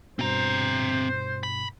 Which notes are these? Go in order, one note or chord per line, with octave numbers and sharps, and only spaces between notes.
G2 B2 C4 C5 A#5
B5